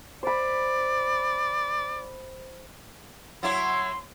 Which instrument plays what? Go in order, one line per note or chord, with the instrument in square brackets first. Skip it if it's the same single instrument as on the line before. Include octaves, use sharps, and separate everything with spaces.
[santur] C5 B5 [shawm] D5
[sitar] F#3 E4 C#5 [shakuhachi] C6